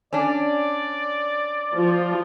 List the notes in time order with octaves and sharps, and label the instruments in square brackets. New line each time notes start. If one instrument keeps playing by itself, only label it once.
[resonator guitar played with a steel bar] C#4 D4 [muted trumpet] D5
[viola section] F3 F4